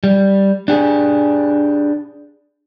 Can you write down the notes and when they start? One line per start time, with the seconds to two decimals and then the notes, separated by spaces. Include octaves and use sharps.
0.04 G3
0.68 D4 G4 G#4